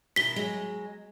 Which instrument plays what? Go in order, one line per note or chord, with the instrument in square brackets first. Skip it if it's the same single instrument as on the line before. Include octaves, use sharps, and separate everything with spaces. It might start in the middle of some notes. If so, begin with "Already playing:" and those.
[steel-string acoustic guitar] B2 D#3 E4 [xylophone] B6 G7
[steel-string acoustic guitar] F#3 G#3